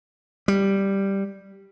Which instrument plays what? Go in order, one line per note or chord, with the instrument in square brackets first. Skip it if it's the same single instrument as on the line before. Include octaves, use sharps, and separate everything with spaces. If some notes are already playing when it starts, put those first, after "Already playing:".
[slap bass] G3